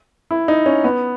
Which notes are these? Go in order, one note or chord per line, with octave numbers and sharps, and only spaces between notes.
E4
D#4
C#4
B3